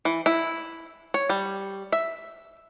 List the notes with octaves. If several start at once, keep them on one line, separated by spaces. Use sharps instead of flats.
E3
E4
C#5
G3
E5